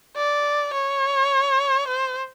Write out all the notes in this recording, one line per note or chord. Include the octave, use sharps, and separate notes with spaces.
D5
C#5
C5